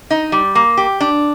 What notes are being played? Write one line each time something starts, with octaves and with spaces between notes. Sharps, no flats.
D#4
G3
A#3
G4
D4